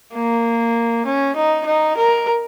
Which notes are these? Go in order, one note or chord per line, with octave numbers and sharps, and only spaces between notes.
A#3
C#4
D#4
D#4
A#4